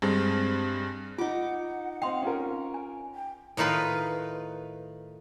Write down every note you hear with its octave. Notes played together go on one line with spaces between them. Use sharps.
G2 G#3 C4
D#4 F4 F#5 D6
C4 D#5 F5 G5 C6
C#4 F4 A#4
G#5
G5
A2 D#3 D#4 F4 B4